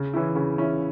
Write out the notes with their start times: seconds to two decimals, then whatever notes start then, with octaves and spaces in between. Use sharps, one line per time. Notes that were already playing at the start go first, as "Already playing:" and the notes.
Already playing: C#3
0.14 E3 C#4 E4
0.35 C#3
0.58 E3 C#4 E4